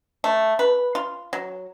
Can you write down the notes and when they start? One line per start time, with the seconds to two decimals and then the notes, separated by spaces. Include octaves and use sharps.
0.24 A3
0.59 B4
0.95 F4
1.33 F#3